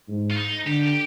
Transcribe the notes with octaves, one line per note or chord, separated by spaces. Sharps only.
G#2
F4
D#4
D3 G4
G4